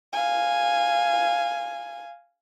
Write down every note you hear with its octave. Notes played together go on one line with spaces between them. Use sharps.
F5 G#5